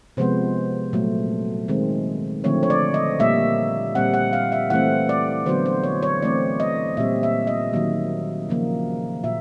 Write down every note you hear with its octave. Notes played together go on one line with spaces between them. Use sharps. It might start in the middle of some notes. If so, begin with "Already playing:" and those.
C3 F3 G#3 B3 C5
A#2 F#3 A3
D#3 G#3 C4
D3 F3 A3 C4 C#5
C#5
D5
D#5
A#2 G3 A#3 E5
A#2 G3 C4 F#5
F#5
F5
E5
E3 A3 C4 F#5
D5
D3 F#3 B3 C5
C5
C#5
C#5
E3 A3 C4 D5
D#5
A#2 G3 C4 E5
E5
D#5
D#3 F#3 A#3
C#3 F3 A#3
A#2 E5